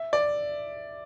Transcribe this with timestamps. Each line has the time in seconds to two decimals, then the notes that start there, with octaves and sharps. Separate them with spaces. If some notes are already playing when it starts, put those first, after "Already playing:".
Already playing: E5
0.13 D5